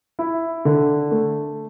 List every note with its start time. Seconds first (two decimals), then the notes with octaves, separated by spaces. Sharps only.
0.19 E4
0.65 D3
1.11 A3